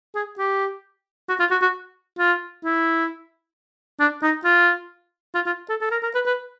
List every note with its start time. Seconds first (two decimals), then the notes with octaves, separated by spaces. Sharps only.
0.15 G#4
0.38 G4
1.29 F#4
1.39 F4
1.51 F#4
1.62 F#4
2.19 F4
2.64 E4
4.00 D4
4.23 D#4
4.44 F4
5.35 F4
5.46 F4
5.69 A4
5.81 A4
5.91 A#4
6.03 A#4
6.14 B4
6.26 B4